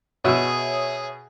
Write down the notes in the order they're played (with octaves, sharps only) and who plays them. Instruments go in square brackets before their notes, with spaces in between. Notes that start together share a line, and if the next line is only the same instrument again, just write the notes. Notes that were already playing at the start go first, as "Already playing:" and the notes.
[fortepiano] B2 E6 [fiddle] G#4 [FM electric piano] C#5 E5 D#6